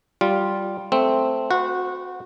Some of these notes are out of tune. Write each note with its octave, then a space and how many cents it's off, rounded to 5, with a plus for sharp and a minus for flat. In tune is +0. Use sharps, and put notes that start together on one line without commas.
G3 -10 F4 +0
A3 +0 C4 +0
F#4 -20 C5 -45 F#5 -15